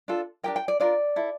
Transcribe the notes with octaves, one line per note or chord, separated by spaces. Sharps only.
D4 F4 A4
D4 G4 A#4 G5
G5
D5
D4 F4 A#4 D5
E4 A4